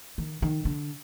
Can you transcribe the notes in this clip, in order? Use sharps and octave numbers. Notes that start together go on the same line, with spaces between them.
D#3
D#3
D3